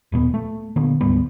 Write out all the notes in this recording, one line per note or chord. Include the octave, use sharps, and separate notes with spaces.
D#1 A#2 B3
A3
A#2 D3 A#3 B3
D2 G#2 G3 B3